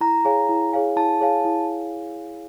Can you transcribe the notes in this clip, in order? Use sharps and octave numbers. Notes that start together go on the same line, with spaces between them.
E4 A#5
G#4 C#5 F5 G#5
E4
G#4 C#5 F5 G#5
E4 A5
G#4 C#5 F5 G#5
E4